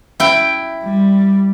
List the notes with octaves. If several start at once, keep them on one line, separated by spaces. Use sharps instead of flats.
E4 G5
G3